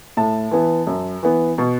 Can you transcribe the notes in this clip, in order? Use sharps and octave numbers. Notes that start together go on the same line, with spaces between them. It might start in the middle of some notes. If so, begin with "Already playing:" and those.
A2 A5
E3 B3
F#2
E3 B3
B2